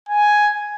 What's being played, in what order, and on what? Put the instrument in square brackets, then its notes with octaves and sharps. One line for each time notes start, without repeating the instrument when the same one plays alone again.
[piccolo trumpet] G#5